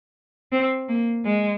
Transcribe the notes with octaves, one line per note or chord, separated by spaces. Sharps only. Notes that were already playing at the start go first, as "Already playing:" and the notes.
C4
A#3
G#3